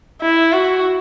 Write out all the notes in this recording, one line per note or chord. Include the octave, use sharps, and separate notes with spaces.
E4
F#4